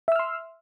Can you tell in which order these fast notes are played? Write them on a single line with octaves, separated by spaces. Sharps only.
E5 E6 F6 C6